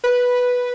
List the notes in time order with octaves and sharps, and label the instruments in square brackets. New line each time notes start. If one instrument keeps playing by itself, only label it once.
[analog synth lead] B4